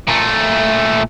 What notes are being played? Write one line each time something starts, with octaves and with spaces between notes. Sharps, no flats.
A#2 A3